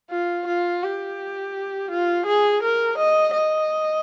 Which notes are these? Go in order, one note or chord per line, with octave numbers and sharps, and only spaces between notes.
F4
F4
G4
F4
G#4
A#4
D#5
D#5